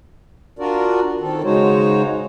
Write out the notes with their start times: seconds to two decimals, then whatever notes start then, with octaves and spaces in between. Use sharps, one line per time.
0.59 D4 F4 F#4 A#4 D5
1.21 D#3 C4 A4
1.44 C#3 G#3 D#4 F#4 C5 C#5